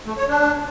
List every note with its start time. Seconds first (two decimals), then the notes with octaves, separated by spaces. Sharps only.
0.07 A3
0.18 C#5
0.29 D4